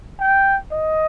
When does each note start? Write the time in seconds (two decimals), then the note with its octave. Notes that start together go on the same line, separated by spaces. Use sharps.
0.20 G5
0.72 D#5